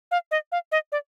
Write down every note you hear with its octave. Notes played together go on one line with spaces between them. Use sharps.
F5
D#5
F5
D#5
D5